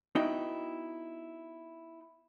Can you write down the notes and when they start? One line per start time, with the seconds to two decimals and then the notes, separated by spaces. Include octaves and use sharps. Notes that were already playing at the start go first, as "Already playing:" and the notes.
0.15 B3 D#4 E4 F#4 D#5 G5